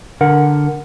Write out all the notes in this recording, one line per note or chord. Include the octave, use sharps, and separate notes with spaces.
D3 A#4 F#5